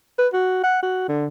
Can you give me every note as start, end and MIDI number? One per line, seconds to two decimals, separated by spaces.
0.18 0.28 71
0.33 0.60 66
0.64 0.79 78
0.82 1.08 66
1.08 1.27 50